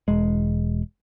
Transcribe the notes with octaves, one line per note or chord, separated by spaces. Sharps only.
E1 G#3